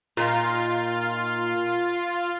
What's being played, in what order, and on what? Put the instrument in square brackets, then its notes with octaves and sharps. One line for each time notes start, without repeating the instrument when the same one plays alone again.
[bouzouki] A#2 D#4 A#4 [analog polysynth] F4